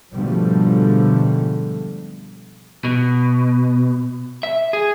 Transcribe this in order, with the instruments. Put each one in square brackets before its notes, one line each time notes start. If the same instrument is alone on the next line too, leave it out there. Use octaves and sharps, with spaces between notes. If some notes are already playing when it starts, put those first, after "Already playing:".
[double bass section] G#2 B2 D3 F3 G3 A3
[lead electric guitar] B2
E5
G#4